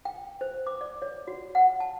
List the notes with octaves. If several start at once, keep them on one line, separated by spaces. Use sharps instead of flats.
G5
C5
D6
D5
C#5
F#4
F#5
A5